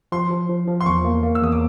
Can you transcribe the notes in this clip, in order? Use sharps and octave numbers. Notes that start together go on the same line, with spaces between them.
F3 C6
F3
F3
F3
C6
E2 C#6
A#3
A#3
E6
E2 D#6
D6